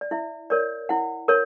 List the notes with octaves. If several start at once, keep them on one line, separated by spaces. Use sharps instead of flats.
D5
E4 E5
A#4 C#5 D5
E4 F#5
A#4 C#5